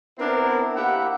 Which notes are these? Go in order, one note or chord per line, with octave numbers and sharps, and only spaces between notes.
B3 C4 D4 E4 A#4
A#3 E4 G4 F#5